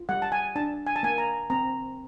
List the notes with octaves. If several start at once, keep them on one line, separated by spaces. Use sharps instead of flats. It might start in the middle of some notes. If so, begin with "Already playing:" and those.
Already playing: F4
G3 F#5
A5
G#5
D4 A5
G#5
A5
A#3 G#5
A#5
C4 A#5